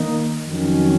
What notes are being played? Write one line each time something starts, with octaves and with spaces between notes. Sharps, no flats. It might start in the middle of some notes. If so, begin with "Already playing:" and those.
Already playing: D#3 A#3 D#4
F2 D#3 F#3 C#4